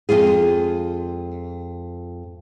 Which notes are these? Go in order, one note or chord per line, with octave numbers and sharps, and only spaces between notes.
F2 G#3 F4 G#4